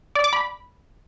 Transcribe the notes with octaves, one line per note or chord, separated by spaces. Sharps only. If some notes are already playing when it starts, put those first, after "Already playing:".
D5
D6
B5